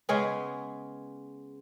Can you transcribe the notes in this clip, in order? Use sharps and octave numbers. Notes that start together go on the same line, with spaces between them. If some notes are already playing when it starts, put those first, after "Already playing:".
C#3 G#3 B3 G#4